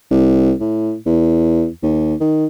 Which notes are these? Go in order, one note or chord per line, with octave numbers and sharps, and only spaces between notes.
C2
A2
E2
D#2
D#3